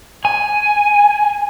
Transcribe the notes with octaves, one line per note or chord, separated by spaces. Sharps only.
G#5